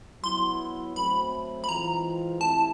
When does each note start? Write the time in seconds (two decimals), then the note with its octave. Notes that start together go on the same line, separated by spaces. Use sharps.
0.23 F#3 B3 E4 C6
0.95 F#3 A3 C4 B5
1.64 B5
1.68 E3 G#3 C4 F4 A#5
2.41 C3 E3 A3 C#4 E4 A5